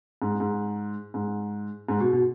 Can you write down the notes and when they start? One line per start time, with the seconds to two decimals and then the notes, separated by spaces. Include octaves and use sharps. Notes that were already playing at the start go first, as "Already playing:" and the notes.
0.22 G#2
0.40 G#2
1.14 G#2
1.89 G#2
2.00 B2
2.13 B2